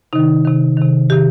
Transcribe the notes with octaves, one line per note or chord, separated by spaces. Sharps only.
C3 D#3 D#4
C3 D#3
C3 D#3
C3 D#3 G4